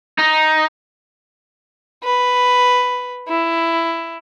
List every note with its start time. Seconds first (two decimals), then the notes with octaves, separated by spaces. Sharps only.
0.19 D#4
2.03 B4
3.28 E4